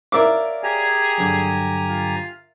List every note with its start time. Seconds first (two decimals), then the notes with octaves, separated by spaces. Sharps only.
0.12 A#4 C#5 D5 E5 F5 D6
0.63 G4 G#4 G#5 A#5
1.18 G2 D3 F#3
1.88 F4